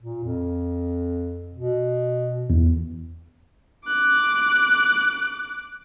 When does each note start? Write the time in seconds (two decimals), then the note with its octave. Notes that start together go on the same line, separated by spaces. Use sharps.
0.01 A#2
0.24 F2
1.53 B2
2.50 E2
3.86 D6 F#6